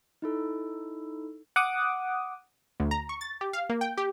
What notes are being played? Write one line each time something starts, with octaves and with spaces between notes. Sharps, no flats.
D#4 E4 A4
F#5 D6 D#6
D2
A#5
C#6
A6
G4
F5
A#3
G5
G4